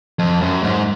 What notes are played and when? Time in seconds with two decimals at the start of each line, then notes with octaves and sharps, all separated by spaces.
0.19 F2
0.41 F#2
0.63 G#2